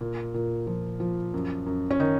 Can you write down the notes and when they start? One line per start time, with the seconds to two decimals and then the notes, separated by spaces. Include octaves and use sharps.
0.01 A#2
0.34 A#2
0.67 F3
1.00 F3
1.34 F#2
1.66 F#2
1.91 C#4
2.00 D#3 D#4